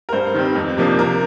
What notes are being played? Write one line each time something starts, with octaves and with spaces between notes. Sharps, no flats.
A#4
G2 C5
D#3 G3 C4
F2
C3 F3 A#3 D4
C3 A#4